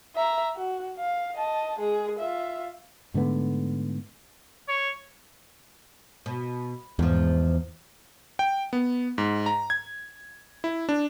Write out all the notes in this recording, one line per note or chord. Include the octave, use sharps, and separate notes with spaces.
E5 A#5
F#4
F5
D#5 A5
G#3 G#4
F4 E5
G#2 D3 A3 B3
C#5
B2
E2 G#2 F3
G5
B3
G#2
A#5
G#6
E4
D4